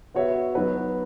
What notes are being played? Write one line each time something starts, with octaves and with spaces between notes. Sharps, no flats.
B3 F#4 C#5 E5
F#3 B3 D#4 F#4 B4